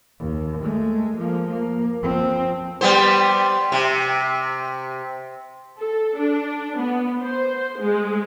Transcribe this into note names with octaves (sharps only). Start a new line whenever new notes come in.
D#2
G#3 A3
F3 A#3
A#3
F3 C4
G3 B3 C5
C3
A4
D4
B3
C5
G#3